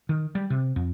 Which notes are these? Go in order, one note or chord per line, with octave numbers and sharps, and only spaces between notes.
D#3
G3
C3
F2